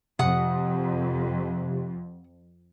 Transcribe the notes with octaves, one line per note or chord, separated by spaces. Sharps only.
F2 C3 F#5 D#6